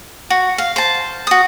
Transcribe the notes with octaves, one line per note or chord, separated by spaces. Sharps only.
F#4
F5
C5 A5
F#4 D#6